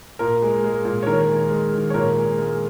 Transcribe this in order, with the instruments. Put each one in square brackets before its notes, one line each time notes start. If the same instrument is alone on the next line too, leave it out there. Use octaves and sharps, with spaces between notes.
[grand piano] A#2 A#4
G#3
G#3
A#2
C#5
D#3 A#4
G#3
G#3
D#3
C#5
A#2 A#4
G#3
G#3